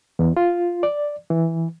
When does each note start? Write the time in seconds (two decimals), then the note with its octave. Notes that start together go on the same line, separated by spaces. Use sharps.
0.19 E2
0.37 F4
0.83 D5
1.30 E3